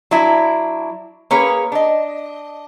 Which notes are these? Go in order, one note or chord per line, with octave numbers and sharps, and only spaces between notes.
F#3 D4 E4
A#3 C#4 G#4 B4 C#5
D4 D#5